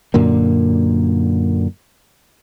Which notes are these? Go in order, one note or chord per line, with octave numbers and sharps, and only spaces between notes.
F#2 A#2 D3 A#3